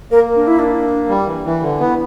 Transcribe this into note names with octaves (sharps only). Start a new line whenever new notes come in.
A#3 A#4
D4
E4
D4
G3
E3
E3
D3
B3 E4